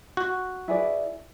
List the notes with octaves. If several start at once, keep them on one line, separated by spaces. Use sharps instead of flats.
F#4
E4 G#4 B4 D5